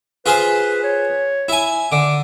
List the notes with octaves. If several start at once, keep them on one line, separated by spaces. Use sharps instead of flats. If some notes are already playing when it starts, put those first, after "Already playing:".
F4 G#4 B4 C5
C#5
E4 G#5
D3 D6